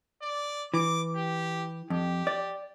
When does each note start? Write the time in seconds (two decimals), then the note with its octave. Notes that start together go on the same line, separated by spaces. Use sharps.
0.22 D5
0.74 E3 D6
1.15 G4
1.90 F2 G4
2.27 D5